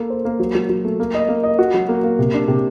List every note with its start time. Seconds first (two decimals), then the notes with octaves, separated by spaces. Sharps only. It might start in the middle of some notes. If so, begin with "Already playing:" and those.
Already playing: A#3 A4
0.10 C5
0.25 A#3
0.40 F#3
0.55 F#3
0.69 F#3
0.85 A3
1.00 A#3
1.15 D#5
1.29 A#3
1.43 D#5
1.59 F#4
1.74 F#3
1.89 A#3
2.04 A#3
2.19 C3
2.34 D4
2.48 C3